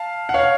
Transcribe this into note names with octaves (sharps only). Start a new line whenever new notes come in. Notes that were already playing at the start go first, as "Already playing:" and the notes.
Already playing: F5 A5
F#5
C#5 F5